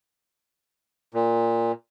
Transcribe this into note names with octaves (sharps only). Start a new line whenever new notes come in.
A#2